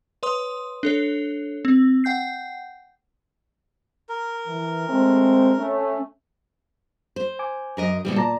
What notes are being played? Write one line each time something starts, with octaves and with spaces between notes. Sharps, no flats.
B4 C#5 C6 D#6
D4 A4 C#5
C4
F#5 G5 G6 C7
A#4
E3
G#3 A3 C4
A3 C#4
C5
G#5 D6
F#2 A#4 D#5
B2 E3 G3
A#2 D5 A5 A#5